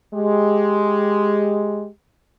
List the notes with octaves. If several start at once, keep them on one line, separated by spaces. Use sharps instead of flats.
G#3 G4